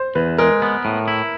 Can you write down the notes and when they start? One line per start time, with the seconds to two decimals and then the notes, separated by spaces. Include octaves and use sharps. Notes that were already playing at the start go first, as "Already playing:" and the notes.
Already playing: C5
0.15 E2 B4
0.38 G#3 A#4
0.62 B3
0.85 A2
1.08 E4